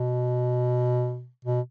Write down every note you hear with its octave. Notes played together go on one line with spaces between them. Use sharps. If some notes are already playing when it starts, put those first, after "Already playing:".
Already playing: B2
B2